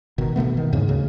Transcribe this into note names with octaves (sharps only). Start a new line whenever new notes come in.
G1 B2 D#3
B2 D3 A3 B3
D#3
E2 G#2 C#3
D2 C#3